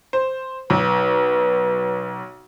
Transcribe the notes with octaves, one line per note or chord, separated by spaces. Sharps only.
C5
B1 B4